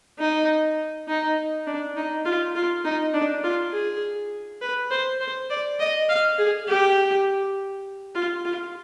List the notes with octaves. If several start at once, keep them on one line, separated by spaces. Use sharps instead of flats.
D#4
D#4
D4
D#4
F4
F4
D#4
D4
F4
G#4
B4
C5
C5
D5
D#5
F5
G#4
G4
F4
F4